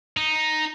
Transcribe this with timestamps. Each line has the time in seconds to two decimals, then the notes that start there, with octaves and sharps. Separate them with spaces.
0.17 D#4